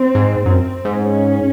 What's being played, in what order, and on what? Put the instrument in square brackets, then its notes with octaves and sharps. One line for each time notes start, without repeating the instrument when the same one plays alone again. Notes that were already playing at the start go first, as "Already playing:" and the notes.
Already playing: [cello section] C4
[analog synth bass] G#2
[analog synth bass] F#2 [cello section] C4
[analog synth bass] G#2
[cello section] C#4